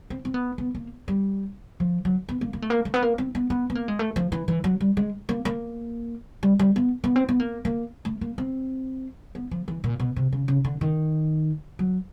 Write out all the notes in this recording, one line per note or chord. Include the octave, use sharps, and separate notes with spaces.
C4
C4
B3
B3
A#3
G3
F3
F#3
B3
A#3
A#3
A3
A#3
A3
B3
A#3
C4
B3
B3
B3
A#3
G#3
A3
F3
E3
E3
F#3
G3
G#3
A#3
A#3
G3
G3
B3
B3
C4
B3
A#3
A#3
A3
A#3
C4
B3
F3
E3
A#2
B2
C3
C#3
C#3
D3
D#3
F#3